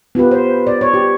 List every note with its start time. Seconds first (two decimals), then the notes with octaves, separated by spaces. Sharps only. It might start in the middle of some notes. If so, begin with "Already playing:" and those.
0.15 B3 F4 G4 B4
0.31 C5
0.67 D5
0.81 C#5
0.94 G4